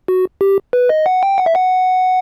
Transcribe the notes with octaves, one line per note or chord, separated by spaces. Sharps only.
F#4
G4
B4
D#5
F#5
G5
F#5
E5
F#5